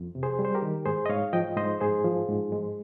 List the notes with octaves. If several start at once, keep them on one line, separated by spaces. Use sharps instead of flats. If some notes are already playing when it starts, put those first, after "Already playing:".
Already playing: F2
C3
G#4 C5
G3
C5
G4 A#4
D#3
G#2 G#4 C5
D#5
G#2 C#5 F5
F3 D#5 G5
G#2 C5 D#5
G#2 G#4 C5
F3
G#2
G#3